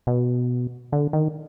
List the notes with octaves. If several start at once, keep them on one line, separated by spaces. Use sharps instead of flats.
B2
D3
D#3